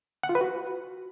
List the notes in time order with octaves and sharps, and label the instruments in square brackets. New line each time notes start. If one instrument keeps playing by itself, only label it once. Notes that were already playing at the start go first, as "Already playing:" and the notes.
[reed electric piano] F#5
F4
B4
F#4